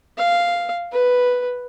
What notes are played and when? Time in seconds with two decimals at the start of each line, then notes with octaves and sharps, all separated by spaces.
0.18 F5
0.92 B4